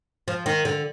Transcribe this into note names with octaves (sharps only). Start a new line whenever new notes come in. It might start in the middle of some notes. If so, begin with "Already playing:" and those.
F3
D#3
D3